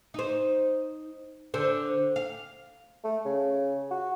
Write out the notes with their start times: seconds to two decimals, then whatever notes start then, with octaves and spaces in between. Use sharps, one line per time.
0.14 D#4 C5
1.54 D3 C5
2.16 F5
3.04 A3
3.25 C#3
3.91 F#4